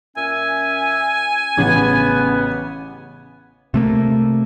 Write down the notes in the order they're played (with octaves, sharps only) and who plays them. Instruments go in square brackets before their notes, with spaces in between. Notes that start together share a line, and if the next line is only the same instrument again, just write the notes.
[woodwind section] A#2 C#4 E5 [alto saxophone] G#5
[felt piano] A1 C#3 [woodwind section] B3
[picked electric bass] C3 A3 A#3